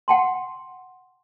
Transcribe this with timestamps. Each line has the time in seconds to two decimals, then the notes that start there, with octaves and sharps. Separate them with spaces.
0.08 F#5 G5 A5 C6